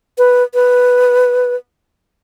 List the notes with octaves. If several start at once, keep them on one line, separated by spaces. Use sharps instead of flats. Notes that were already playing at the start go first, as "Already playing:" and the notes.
B4
B4